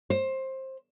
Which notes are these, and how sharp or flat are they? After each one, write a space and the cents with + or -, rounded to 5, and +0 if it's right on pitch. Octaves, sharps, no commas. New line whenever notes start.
C5 +20